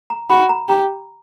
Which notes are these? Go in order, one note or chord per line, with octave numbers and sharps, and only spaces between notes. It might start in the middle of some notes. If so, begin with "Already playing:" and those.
A#5
F#4 B5
A#5
G4 A#5